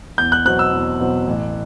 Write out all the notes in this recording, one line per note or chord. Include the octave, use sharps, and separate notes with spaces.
E2 G6
F#6
B2 F#3 C4 F#6
E6
E2
B2 F#3 C4
A1